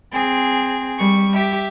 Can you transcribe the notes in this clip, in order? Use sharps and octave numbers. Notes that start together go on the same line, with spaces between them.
C4 G#4
G3 C#6
G4 E5